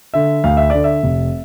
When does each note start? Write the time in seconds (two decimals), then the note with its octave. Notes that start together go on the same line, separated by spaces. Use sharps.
0.14 D3 E5
0.44 D2 F5
0.57 E5
0.70 D3 D5
0.84 E5
1.04 F1